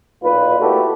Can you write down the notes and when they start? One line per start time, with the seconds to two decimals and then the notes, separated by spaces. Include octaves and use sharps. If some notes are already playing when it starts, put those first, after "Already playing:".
0.22 B1 A#2 D#4 F4 B4
0.60 A3 A#3 E4 F#4 G4 A4